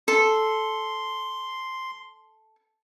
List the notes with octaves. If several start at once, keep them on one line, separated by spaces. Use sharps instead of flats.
A4 C6